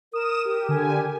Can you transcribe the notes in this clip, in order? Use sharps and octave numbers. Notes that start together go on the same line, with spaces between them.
A#4 D#6 E7
G4
D3 G4 G#5